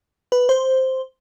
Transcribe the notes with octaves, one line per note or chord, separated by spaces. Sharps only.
B4
C5